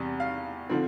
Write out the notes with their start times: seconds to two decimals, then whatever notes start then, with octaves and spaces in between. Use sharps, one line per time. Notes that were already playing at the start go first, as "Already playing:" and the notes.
Already playing: E2 C3 G3
0.20 F5
0.69 D3 F3 C4